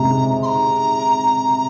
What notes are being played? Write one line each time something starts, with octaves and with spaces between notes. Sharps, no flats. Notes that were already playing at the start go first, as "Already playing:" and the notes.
Already playing: C3 G#3 A#5
C6
A#5